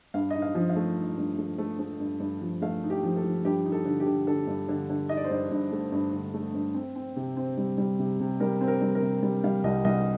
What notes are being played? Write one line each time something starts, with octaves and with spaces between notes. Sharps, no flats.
G2 F5
D#4 D#5
F5
F3
F5
A3
D#4
G2
A3
A3
A3
G2
G2
F3
A3 F5
D#4
G4
F3
A4
F3
G2 G4
D#4
A4
D3
G4
D3
D3 A4
G2
D3
D3
D#4 D#5
D5
C5
G2 D5
G2
A3
G2
D3
A3
G2
C4
C4
C3
C4
G3
G3
C3
C3
G3 A#4
C4
A#4
G3
A#4
C3
G3
G3 F5
C2 D#5
C2 D#5